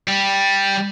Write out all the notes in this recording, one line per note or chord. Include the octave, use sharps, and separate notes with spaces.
G3